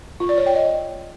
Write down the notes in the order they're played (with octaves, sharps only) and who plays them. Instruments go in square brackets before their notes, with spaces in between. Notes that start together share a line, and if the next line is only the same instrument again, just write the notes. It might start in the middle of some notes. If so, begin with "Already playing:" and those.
[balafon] F4
D5
C#5
G5
D#5